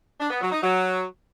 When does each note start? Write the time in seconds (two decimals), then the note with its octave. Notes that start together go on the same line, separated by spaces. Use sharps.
0.20 D4
0.31 B3
0.41 F#3
0.52 D#4
0.62 F#3